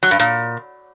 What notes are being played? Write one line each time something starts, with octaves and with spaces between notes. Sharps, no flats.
F#3
G2
A#2